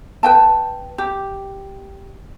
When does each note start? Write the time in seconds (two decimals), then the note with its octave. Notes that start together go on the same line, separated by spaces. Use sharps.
0.23 B4 G5 A5
0.98 G4